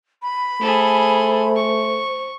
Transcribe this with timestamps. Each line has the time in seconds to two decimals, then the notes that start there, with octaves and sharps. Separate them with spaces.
0.22 B5
0.61 A3 G#4 A4 C5
1.56 C#6